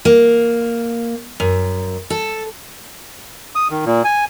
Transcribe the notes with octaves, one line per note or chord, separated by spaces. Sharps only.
A#3
F#2
A4
D#6
D#3
A#2
G#5